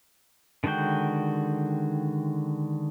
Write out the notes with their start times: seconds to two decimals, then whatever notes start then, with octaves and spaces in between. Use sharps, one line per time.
0.64 D3 D#3 G#3 F#4 G5